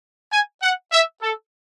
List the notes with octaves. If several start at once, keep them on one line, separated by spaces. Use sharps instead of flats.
G#5
F#5
E5
A4